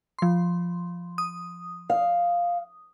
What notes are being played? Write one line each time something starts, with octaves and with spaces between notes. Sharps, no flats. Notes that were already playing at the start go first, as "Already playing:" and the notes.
F3 C6
D#6
F5